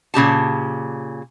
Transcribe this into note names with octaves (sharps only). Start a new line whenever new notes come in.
A#2 C#3 G4 A5